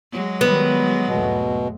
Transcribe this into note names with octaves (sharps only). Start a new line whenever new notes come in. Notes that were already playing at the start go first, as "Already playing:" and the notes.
F#3 G#3
D#3 G3 B3
G#1 E2 B2 A3